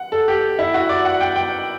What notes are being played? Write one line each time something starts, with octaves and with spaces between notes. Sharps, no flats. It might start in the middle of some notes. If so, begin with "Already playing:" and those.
Already playing: F#5
A4
G4
E4
F#4
D5
F#5
G5
G5